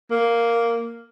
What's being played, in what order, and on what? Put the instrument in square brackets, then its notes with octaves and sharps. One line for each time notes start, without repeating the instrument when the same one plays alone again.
[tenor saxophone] A#3